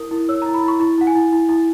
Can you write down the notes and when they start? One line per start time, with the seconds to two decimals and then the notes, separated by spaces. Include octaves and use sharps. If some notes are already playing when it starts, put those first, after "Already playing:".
Already playing: E4 A#4 D#6
0.11 E4
0.29 C#5 E6
0.42 E4 A#5
0.54 B5
0.64 E4 C#6
0.80 E4 C#6
0.98 E4 F#5
1.07 G#5
1.15 E4
1.33 E4
1.49 E4